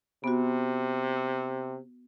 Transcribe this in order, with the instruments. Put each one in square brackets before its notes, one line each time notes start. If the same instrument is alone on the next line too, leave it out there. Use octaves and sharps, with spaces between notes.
[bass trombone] C3 [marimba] B3 F#4